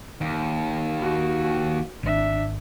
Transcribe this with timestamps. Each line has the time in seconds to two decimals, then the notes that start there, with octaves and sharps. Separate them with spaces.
0.21 D#2
1.02 F#4
2.03 G#1 D4 E5